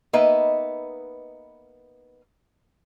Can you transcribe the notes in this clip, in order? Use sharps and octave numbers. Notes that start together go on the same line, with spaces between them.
A#3 B3 D#4 B4 D#5 E5